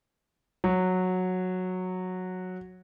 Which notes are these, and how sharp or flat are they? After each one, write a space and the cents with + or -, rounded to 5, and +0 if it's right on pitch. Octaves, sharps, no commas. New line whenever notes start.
F#3 -10